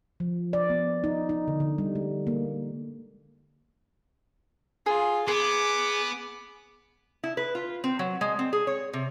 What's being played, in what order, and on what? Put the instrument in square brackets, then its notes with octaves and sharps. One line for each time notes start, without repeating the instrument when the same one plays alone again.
[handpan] F3
D5
B3
D#4
D#4
D3
D3
G3
G#3
A#3
[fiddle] F4 [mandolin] G#4
[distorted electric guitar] B3 [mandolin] G#4 [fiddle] D6
[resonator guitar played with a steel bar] E4
B4
F4
C4
F#3
G#3
C4
G#4
C#5
C3